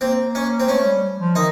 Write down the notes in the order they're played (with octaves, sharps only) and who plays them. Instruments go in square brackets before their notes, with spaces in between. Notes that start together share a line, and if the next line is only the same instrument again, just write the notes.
[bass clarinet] A#3 [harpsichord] C4
[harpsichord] C#4
C4
[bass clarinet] A3 [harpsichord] C#4
[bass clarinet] G3
F3
[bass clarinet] D#3 [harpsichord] D#4